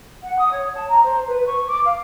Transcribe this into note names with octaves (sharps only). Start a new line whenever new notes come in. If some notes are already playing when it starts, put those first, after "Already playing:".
F#5
D#6
C#5
A5
A#5
C5
B4
C#6
D6
F5